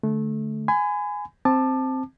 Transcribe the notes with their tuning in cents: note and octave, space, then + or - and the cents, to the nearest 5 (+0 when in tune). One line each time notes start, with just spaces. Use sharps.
D3 +0 A3 -20
G#5 +0 B5 +35
C4 +0 A5 +0 D6 +30